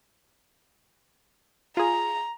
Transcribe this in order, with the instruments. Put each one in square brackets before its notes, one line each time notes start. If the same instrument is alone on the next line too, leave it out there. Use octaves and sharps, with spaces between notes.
[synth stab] F4 G#4 [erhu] A#5